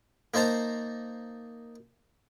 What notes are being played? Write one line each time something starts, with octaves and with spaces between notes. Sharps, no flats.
A#3 D#4 C5 A5 A#5